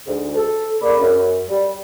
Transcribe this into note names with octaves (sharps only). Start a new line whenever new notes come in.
D2 G#2
A4
C#3 A#3 D5 B5
F#2
G3